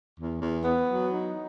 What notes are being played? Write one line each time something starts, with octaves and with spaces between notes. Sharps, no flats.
E2
E2
B3
F#3
D#4